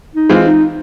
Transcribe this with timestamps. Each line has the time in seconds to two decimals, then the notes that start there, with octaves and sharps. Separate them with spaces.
0.15 D#4
0.29 E3 G#3 C4 F4
0.44 D#4